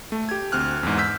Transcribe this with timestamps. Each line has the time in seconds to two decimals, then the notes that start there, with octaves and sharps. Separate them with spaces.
0.12 A3
0.29 G4 G#6
0.52 D2 C4 F6 F#6
0.83 E2 G#2
0.98 E6 G6 B6